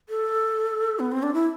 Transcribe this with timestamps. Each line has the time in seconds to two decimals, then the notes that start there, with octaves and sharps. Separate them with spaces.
0.09 A4
0.99 B3
1.12 C4
1.23 D4
1.34 E4